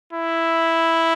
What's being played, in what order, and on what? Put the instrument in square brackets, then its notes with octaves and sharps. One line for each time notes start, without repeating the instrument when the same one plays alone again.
[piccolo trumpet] E4